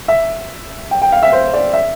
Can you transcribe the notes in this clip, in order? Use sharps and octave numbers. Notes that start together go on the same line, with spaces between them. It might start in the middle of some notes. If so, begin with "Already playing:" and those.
E5
G5
G5
F5
E5
C5
D5
E5